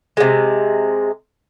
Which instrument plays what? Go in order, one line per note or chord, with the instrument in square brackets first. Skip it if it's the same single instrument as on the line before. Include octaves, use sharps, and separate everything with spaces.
[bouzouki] C3 G#3